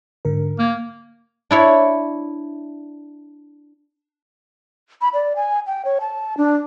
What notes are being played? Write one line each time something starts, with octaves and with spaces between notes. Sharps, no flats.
G#2 D3 A#4
A#3 F6 G#6
D4 E4 C#5
B5
D5
G#5
G5
C#5
A5
D4